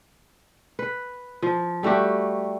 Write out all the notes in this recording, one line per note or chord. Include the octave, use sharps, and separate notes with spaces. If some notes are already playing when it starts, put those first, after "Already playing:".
B4
F3
G3 A3 F#4 G4